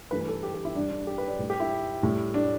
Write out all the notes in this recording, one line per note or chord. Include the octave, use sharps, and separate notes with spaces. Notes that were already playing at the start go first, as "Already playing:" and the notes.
G2 E3 A3 B4
B4
A4
G4
G4
E4
G2 G3 D4
D4
G4
B4
D5
A2 G3
G4
E4
A2 G3
D4